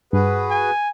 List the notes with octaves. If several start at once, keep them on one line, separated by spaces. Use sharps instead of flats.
G2 F#4 G#4 B4
G#5